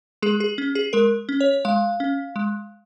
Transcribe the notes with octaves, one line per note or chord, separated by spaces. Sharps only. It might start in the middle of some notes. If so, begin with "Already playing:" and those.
G#3 G#4
G#4
C#4
G#4
G#3 A#4
C#4
C#5
G#3 F5
C#4
G#3